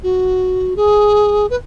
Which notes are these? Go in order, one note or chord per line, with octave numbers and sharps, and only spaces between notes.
F#4
G#4
B4